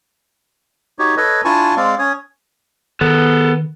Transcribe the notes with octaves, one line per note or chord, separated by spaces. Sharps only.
D#4 F#4 G4 C#5
A4 B4 C#5 D#5
D4 E4 F4 G#5 A5 C#6
G#3 C4 D5 F5
C#4 C#5 D#6
D#3 B3 A4 A#4